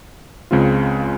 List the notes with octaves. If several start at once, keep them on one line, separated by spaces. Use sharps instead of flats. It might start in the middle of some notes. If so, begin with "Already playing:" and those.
C#2 C#3 G#3 C4 F4